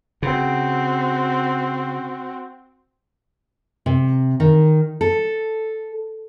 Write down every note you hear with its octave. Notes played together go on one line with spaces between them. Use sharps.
C#3 C4 F#4
C3
D#3
A4